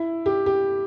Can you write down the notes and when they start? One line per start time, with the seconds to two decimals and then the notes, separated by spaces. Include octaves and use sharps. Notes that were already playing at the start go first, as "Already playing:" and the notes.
Already playing: E4
0.26 G4
0.46 G4